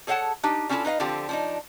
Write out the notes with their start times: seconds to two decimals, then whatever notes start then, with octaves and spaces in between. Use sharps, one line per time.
0.07 G#4 A4 C#5 F5 F#5 A5
0.43 D4 D#4 G4
0.69 G3 C#4 D4 E4 F4 A4
0.85 D#4 B4 D#5 F5
1.00 D3 F3 C4 F4 G4
1.29 F3 D4 D#4